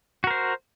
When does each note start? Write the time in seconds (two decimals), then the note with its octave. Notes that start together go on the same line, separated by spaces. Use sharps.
0.24 F#4
0.27 A#4
0.31 C5